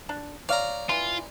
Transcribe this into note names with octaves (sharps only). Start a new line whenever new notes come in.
D4
C#5 D5 F5 A#5
E3 F4 C6